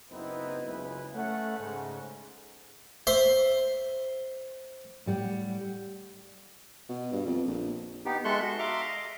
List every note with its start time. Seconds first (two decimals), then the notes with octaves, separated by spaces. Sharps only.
0.10 F#1 B3 C4 D#4 E4 B4
0.65 F#1 C#2 E4 B4
1.13 A3 C#4 F#5
1.58 G#2 C#3
3.07 C5 E5 C6
5.06 A2 G3 F#5
6.89 B2
7.12 G2
7.26 F2
7.47 A#1
8.05 B3 D#4 G4
8.25 G#3 A4 E5 C6 C#6 F#6
8.42 F#4
8.59 E5 F5 A#5 C6 D6
8.88 D#5